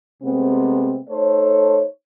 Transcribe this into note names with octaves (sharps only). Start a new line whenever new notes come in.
C3 G#3 A3 B3 C4
A3 D#4 A4 C5 C#5